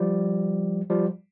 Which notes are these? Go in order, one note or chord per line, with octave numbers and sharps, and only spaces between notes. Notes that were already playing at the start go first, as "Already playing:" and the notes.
Already playing: F3 G3
F3 G3